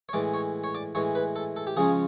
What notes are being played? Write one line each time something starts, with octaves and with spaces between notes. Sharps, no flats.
C#5
A2 E3 G#3 D5
C#5
C#5
D5
A2 E3 G#3 C#5
B4
A4
A4
G4
C#3 F3 G#3 C#4 G#4